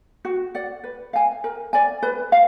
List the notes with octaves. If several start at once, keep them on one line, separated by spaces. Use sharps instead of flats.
F#4
D5 F#5
B4
F5 G#5
A#4
D5 G#5
B4
F5